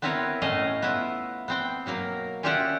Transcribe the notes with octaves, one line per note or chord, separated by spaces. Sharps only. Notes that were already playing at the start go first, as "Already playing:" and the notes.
B3 C4 E4 A#4 B4 C#5
A2 A3 C#4 D#5 F5
B3 E4 F4
B3 C4 G5
B2 F#3 A#3 A#4
C#4 F4 G4 D5 E5 F#5